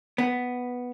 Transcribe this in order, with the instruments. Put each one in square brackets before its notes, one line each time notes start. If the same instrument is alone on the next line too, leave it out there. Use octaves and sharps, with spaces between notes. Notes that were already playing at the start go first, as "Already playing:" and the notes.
[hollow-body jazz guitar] B3